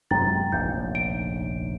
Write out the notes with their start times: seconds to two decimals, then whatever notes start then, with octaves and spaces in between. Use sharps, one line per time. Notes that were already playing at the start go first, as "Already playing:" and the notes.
0.11 F#2 C3 G#3 G5 A#5 A6
0.52 F1 A#1 D#2 G6
0.95 D7